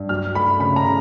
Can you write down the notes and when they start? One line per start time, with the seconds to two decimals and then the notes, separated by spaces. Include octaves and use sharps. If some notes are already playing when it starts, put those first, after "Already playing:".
Already playing: G2
0.09 F#3 F6
0.35 A3 B5
0.59 C#3 B5
0.76 A#5
0.84 C#3